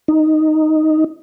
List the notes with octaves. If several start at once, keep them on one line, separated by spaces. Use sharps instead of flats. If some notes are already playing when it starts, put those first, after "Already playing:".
D#4